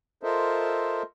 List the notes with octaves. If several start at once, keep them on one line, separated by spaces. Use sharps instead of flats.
F4 A4 A#4 C5 D#5 E5